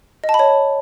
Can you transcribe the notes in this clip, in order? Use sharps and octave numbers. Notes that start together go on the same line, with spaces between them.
D#5
A5
B5
C#5